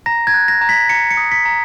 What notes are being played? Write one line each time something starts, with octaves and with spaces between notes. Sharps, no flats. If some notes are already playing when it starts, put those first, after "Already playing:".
A#5 A#6
G#6
F#6
A#6
A#5
B6
A#5 C#7
C#7
D#6
B6
A#5